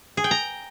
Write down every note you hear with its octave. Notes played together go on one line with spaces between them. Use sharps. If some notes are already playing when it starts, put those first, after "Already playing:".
G#4
G5
A#5